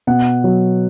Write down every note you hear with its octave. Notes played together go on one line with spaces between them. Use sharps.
B2 F#5
F#3